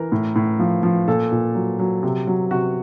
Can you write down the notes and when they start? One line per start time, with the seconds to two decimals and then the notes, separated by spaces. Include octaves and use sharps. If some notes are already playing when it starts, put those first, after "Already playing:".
Already playing: E3 A#4
0.12 A2
0.36 A2
0.59 F3
0.83 F3
1.08 A#2 A4
1.32 A#2
1.55 F#3
1.79 F#3
2.03 C3
2.27 F#3
2.51 C3 F#4